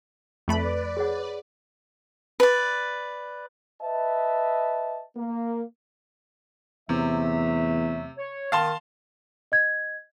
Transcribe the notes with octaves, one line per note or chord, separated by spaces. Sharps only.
F2 A3 B4 D5 B5
G#4 C#5 F#5
B4 D5
B4 D#5 E5 A5
A#3
E2 C3 F#3 A3 E5
C#5
D#3 F5 A5 C6
D#5 G#6